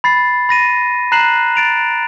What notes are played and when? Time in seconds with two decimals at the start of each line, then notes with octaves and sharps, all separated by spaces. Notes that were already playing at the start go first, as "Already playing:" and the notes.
0.04 B5 A6 C7
0.49 B5 A#6 D#7
1.12 A#5 F#6 C7 E7 F#7
1.55 A6 D7 F7